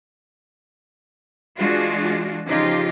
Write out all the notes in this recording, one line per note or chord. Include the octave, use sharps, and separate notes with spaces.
E3 G#3 D4 F4 F#4
C#3 F3 D#4 F4 G4